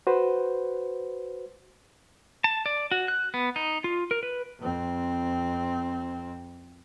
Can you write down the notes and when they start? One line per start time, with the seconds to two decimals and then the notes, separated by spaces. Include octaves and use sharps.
0.07 F#4 B4 C5
2.44 A5
2.66 D5
2.91 F#4
3.08 F#6
3.34 B3
3.56 D#4
3.84 F4
4.11 A#4
4.23 B4
4.60 F2 C4